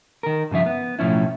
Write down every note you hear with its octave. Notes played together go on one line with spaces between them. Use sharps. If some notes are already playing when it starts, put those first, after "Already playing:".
D#3 A#4
G2 C#3 F3 E5
B3
B1 A2 F3 C#4 E4